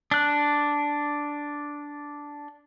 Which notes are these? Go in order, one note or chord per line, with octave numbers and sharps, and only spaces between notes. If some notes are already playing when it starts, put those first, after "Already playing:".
D4 F#6